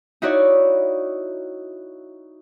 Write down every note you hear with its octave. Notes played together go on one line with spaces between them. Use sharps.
D#4 E4 F#4 C#5 D5